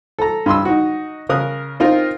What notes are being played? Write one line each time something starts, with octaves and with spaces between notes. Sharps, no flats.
A4 A#5
G2 B5 C6 E6
D#4 F#4
C#3 A#4 D#6 F#6
C4 D#4 F4 A#4